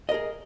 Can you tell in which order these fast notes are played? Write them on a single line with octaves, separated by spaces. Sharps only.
D#5 A#4 G#4